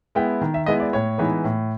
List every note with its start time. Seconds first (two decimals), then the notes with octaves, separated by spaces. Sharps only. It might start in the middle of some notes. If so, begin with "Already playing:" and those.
0.15 G#3 B3 E4 G5
0.41 D#3
0.54 E5
0.66 G#3 B3 E4 D#5
0.80 D5
0.93 A2 C#5
1.18 E3 G#3 B3 D#4
1.44 A2